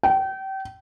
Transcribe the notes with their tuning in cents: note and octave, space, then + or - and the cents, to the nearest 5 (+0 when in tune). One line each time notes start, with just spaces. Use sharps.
G5 -30